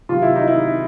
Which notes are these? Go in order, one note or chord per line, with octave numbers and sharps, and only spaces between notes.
C3 D#3 F#3 F4
E4
D#4
E4